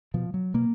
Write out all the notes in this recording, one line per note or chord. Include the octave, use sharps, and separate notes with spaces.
B2 F3
F#3
B2 A#3